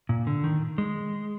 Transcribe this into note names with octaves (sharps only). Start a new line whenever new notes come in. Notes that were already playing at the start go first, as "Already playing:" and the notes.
A#2
D3
D#3
G#3